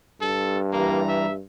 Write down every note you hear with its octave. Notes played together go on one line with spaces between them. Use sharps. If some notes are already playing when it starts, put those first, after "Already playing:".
G2 A4
E3 G3 A#3 A#5
E5